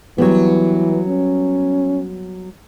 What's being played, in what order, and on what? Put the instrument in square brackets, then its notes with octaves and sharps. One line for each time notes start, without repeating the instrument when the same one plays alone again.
[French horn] E3 [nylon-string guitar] F#3 G3 B3
[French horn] C#4